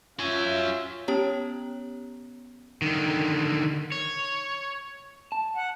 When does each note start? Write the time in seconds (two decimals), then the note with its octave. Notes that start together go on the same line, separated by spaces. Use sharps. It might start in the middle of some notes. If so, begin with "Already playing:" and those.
0.19 C#4 F4 F#4 E5 G#5
1.08 B3 C#4 G4 C#5 A#5
2.82 D3 D#3
3.92 C#5
5.32 A5
5.56 F#5